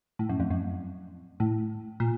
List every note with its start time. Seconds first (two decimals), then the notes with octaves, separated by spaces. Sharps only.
0.19 A2
0.29 F#2
0.40 F2
0.51 F#2
1.40 A2
2.00 A#2